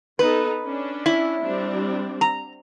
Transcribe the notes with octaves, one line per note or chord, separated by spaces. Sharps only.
B3 D#4 A4 B4
C#4 D4
E4
G3 C4 D4
A#5